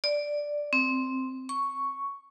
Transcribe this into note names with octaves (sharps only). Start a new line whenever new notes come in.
D5
C4
C#6